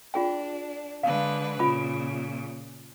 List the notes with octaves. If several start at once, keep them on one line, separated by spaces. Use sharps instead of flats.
D4 F4 G#4 G5
D3 G#3 B4 F5
A#2 C#3 F4 B5 D6